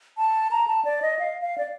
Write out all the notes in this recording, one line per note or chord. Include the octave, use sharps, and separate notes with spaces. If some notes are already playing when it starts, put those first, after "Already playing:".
A5
A#5
A5
D5
D#5
F5
F5
D5